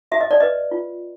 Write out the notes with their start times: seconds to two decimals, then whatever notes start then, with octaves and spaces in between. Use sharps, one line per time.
0.12 F#4 E5
0.21 D#5
0.31 D5
0.40 B4 D#5
0.71 F4